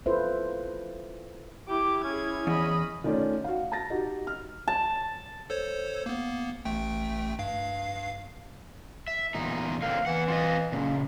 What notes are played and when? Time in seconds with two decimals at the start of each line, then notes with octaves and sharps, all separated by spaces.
0.06 E4 F4 A4 B4 C5 E5
1.68 E4 G4 D6
2.04 C#4 G#4 G#6
2.47 E2 D#5 B5
3.04 D#3 A3 C#4 F4 D5
3.44 F#4 F5
3.72 A5 A6 A#6
3.90 D#4 F#4 G4
4.27 F6
4.68 A5
5.50 A4 C5 C#5
6.06 A#3 B3
6.65 A1 A3 G5
7.39 G2 F5 C7
9.08 E5
9.34 E2 A#2 D#4
9.82 D3 A#3 C4 F5
10.06 E2 E3 F#5
10.28 C4 F4 D#5
10.73 A#2 C#3